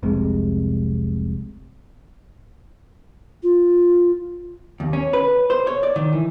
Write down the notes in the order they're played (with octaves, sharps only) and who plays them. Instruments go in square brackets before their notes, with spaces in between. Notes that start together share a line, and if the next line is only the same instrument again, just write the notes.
[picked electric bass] F1 C2 C3 G#3
[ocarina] F4
[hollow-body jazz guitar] D#2
C#4
B4
C5
C#5
D5
D#3
E3